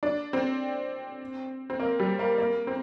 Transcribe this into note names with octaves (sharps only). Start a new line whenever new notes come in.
D4
C4
C4
A#3
G3
A#3
A#3
C4